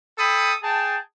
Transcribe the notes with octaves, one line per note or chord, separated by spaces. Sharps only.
A4 G5 B5 D#6
G#4 G5 A5